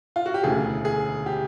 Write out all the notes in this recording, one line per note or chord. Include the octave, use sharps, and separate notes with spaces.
F4
F#4
G4
E1 D2 C#3 E3 G#4
G#4
G4